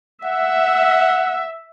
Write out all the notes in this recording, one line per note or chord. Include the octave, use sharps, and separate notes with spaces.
E5 F#5